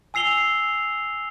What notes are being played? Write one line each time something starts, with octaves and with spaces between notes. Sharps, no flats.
G#5 E6 C7 F7 G7